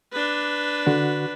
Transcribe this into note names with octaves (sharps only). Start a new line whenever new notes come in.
D4 B4
D3 F#4